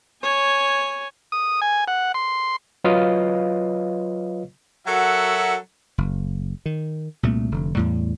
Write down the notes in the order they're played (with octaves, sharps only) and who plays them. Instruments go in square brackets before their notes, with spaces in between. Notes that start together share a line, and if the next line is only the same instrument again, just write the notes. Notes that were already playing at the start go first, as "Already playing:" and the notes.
[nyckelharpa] C#5 G#5
[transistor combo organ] D#6
G#5
F#5
C6
[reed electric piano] F#3 F4 B4 C#5 D#5 F5
[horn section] F#3 F#4 A4 A#4 E5 F#5
[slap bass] F#1
D#3
C2 A#2 A3
F1 D3
E2 A2 G3